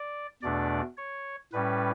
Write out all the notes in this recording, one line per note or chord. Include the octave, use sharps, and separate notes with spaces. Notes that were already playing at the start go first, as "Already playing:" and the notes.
Already playing: D5
E2 B2 A3 D4 D5
C#5
A2 G3 C#4 B4